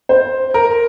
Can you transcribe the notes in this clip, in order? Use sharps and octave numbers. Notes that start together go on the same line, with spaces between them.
C5
A#4